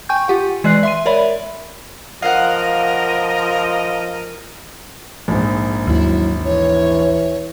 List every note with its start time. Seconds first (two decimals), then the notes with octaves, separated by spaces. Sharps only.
0.09 G5 G#5 C#6 G6
0.28 F4 G4 F#5
0.64 E3 G#3 D5 F#6 C7
0.83 E5 C6 D#7
1.06 A#4 C#5 D5 E5 B5
2.22 F3 A#4 D#5 F5 F#5
5.28 A#1 G#2
5.87 D#2 F#3 E4
6.45 E3 C#5